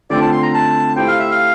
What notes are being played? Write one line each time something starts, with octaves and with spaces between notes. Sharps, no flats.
D3 A3 C4 F4 D5
A5
C6
A#5
A5
A3 E4 G4 C5 G5
F5
E5
F5